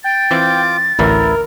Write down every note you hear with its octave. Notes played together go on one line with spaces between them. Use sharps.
G5 A6
E3 C4 F4 D6
A1 D2 E3 E4 A#4